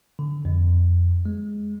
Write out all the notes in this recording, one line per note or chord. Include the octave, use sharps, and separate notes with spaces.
D3
F2
G#3